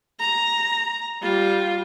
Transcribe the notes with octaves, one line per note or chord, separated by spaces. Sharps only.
A#5
G3 F4